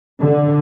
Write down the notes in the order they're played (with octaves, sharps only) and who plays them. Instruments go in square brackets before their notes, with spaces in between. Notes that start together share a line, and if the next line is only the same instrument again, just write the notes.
[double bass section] D3